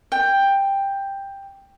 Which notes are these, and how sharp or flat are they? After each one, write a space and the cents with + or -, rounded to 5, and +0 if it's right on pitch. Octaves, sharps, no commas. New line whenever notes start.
G5 +10